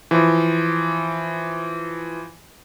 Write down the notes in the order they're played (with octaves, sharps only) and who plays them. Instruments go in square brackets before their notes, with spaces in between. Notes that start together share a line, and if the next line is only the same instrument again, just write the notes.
[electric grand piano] E3 F3